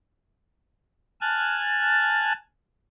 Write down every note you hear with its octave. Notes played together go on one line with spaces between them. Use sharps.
G#5 A5 F6 F#6 G#6 A6